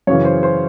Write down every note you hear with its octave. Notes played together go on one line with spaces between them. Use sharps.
F#2 C#3 E3 C#5
C5
C5